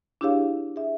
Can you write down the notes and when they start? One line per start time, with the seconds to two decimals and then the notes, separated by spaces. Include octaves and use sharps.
0.21 D4 E4 G4 G#4 C#5 F5
0.76 G#4 E5